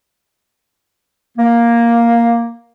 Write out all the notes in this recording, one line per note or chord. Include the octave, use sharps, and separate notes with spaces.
A#3